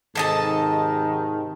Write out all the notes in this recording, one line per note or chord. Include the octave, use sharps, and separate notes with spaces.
G#2 C3 D#3 A4 D#5 A5